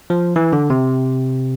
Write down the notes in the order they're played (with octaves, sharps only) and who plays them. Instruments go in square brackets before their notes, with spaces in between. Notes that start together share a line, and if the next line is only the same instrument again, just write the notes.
[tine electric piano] F3
E3
D3
C3